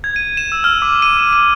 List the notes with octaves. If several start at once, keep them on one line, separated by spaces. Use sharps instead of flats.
G#6
D#7
E7
E6
F6
D6
D#7
D6
D#7